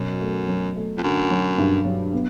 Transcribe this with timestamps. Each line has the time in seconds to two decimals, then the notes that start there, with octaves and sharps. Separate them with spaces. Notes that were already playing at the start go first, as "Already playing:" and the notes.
Already playing: F#2 B2 F#3
0.21 A3
0.48 F#3
0.76 A3
0.98 F2
1.03 F#2 D3
1.31 F#3
1.58 G2
1.85 F#3
2.13 B3